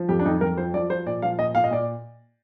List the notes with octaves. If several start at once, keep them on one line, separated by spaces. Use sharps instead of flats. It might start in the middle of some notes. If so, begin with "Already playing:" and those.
Already playing: F3
F2 G4
D4
F2 D#4
F2 A#4
F3 C5
F3 D5
F3 C5
A#2 D5
F3 F5
A#2 D#5
A#2 F5
D#5
A#2 D5